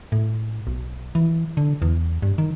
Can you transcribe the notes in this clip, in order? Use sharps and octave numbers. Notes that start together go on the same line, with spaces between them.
A2
B1
E3
D3
E2
G2
D#3